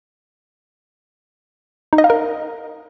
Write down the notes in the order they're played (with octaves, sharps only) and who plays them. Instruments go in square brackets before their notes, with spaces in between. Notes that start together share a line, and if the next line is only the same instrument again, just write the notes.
[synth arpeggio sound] D#4
D#5
F5
A#4